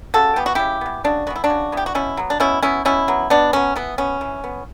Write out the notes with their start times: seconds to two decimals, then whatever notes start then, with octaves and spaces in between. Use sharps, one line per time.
0.14 C#3 F#4 A4
0.36 E3 B3 G4
0.46 F#4
0.55 C#3 E4 G4
0.81 E3 B3
1.04 C#3 D4 F#4
1.27 E3 B3 F#4
1.36 E4
1.44 D4 F#4
1.50 C#3
1.72 E3 B3 G4
1.86 F#4
1.95 B2 C#4 E4
2.17 F#3 B3
2.30 D4
2.40 B2 C#4 E4
2.63 F#3 B3 C#4 E4
2.85 B2 C#4 E4
3.08 F#3 B3
3.30 B2 B3 D4
3.53 F#3 B3 C#4
3.76 E3 B3
3.98 B3 C#4
4.21 E3
4.44 B3